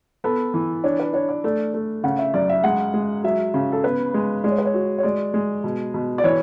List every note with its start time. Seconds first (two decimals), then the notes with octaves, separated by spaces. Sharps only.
0.24 B3 A4
0.54 E3
0.84 D4 C#5
1.00 B4
1.13 D4 C#5
1.29 D5
1.44 A3 D5
1.74 A3
2.04 C#3 F#5
2.19 E5
2.34 F#2 D5
2.50 E5
2.64 G#3 F#5
2.94 G#3
3.24 F#3 E5
3.54 C#3
3.72 A4
3.84 B3 B4
4.14 G#3
4.44 G#3 D5
4.51 C#5
4.58 B4
4.65 C#5
4.74 F#4
4.98 C#5
5.03 G#3 D5
5.34 G#3
5.64 B2
5.94 B2
6.18 D5
6.24 E3 C#5